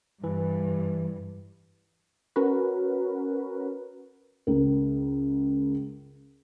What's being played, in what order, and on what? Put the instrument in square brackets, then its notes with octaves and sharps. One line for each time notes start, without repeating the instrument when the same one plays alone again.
[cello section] G2 [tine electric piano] E3
[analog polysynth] C#4 F#4 A#4 B4
[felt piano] C#2 A#4